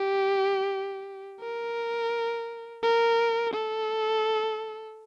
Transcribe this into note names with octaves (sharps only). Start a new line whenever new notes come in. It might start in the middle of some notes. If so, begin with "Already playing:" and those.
Already playing: G4
A#4
A#4
A4